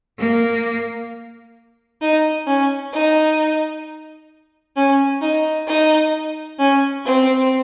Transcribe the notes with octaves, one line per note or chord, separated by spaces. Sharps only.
A#3
D#4
C#4
D#4
C#4
D#4
D#4
C#4
C4